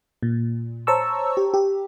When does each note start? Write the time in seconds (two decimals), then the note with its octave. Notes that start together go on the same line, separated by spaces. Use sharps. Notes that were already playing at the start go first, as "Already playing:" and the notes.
0.23 A#2
0.87 C5 C#5 A5 A#5 C#6 E6
1.37 G4
1.54 G4